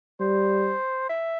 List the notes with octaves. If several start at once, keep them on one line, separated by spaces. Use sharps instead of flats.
G3 C5
E5